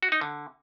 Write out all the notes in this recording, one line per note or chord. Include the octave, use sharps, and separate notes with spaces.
F#4
D#4
D3